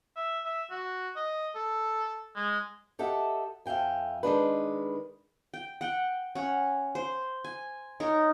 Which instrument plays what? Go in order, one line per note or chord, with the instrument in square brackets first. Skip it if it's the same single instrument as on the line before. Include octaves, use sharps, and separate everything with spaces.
[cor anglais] E5
E5
F#4
D#5
A4
G#3
[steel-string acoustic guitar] G4 A4 D#5 E5 F#5
F2 E5 F5 G5 G#5
D#3 G#3 D4 B4
[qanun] G5
F#5 G5
C#4 F#5
C5
G#5
D#4 A#4 C#5